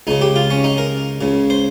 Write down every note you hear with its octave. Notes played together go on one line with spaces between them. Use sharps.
C#2 C#3 D#4
G4
F4
C#4
D#4
A#4
C#2 C#3
C5